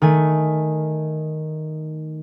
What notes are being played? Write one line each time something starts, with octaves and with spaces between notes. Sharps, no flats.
D#3 A3 G#5